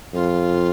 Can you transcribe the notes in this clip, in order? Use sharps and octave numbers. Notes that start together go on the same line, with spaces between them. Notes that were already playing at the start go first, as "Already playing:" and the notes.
F2 F4